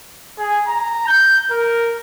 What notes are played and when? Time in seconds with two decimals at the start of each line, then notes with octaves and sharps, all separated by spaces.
0.38 G#4
0.68 A#5
1.07 G6
1.51 A#4